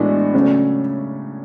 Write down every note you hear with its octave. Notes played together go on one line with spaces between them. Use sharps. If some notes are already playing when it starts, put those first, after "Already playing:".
Already playing: A2 E3 G#3 B3 D4 F#4
C#3 F#3 A3 C#4 D4